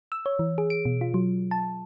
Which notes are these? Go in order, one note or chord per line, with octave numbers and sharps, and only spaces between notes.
E6
C#5
E3
G#4
D7
B2
F4
F#3
A5